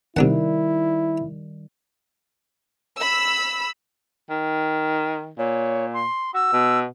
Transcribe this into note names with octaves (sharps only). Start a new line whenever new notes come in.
C3 D#3 G3 D4 E4 F#5
B5 E6
D#3
A#2 C#5
C6
F#4 E6
B2